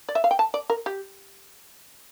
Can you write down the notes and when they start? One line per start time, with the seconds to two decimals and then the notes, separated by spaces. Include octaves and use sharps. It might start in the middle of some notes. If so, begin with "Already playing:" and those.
0.09 D5
0.15 E5
0.24 F5
0.31 G5
0.39 A5
0.54 D5
0.70 A#4
0.86 G4